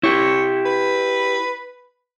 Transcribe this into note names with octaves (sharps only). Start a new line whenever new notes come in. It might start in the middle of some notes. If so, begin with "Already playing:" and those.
E4 G4 C#5
B4